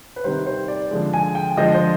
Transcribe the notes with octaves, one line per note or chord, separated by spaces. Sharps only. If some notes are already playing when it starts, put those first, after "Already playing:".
B4
C3 D#3 G3 C5
C5
D5
D3 F3 G#3
G#5
G5
D3 F3 G#3 D#5
C5